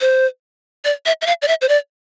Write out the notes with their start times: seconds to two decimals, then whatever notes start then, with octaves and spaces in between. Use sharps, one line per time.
0.01 C5
0.85 D5
1.06 E5
1.22 E5
1.27 F5
1.42 D5
1.48 E5
1.62 C5
1.69 D5